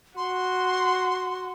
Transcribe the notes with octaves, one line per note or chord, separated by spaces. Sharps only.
F#4 C6